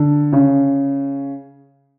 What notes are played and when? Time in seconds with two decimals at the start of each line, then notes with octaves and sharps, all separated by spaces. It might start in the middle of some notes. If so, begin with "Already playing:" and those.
Already playing: D3
0.33 C#3